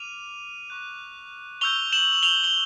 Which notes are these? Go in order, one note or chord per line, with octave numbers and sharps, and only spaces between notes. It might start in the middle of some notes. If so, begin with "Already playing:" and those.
Already playing: D6 F6 D#7 F7
C#6 F#6
C#6 E6 G6 F7 G7
E7 F#7
F#7
F7 G7
G7